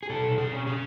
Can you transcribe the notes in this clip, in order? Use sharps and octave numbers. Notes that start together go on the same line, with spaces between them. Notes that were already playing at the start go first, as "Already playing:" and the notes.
G#4
B2 A4
B2
G#4
C#4
G#4